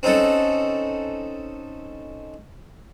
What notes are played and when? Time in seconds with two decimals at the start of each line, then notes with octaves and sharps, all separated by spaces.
0.03 C4 C#4 D#4 A4 F#5